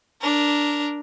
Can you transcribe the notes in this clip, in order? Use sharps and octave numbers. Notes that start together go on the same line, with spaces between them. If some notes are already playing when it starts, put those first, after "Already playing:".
D4 A#4